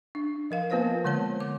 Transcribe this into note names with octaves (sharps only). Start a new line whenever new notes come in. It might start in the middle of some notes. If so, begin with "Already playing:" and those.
D4
F3 A#4 F5
A#3 B3 F4 B4 C5 F5
D3 G#3 C#5 A5
D6